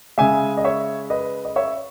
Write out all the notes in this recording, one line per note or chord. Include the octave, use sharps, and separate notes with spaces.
C#3 G#3 E5 G#5
D#5
C#5 E5
B4 D#5
D#5
C#5 E5